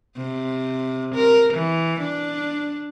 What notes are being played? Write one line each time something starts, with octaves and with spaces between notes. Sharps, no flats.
C3
A#4
E3
D4